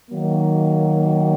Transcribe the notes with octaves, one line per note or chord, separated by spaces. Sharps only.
D#3 F#3 A#3